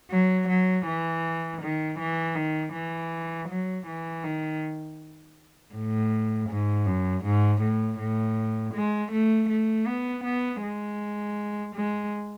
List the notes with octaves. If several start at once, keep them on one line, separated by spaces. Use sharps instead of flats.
F#3
F#3
E3
D#3
E3
D#3
E3
F#3
E3
D#3
A2
G#2
F#2
G#2
A2
A2
G#3
A3
A3
B3
B3
G#3
G#3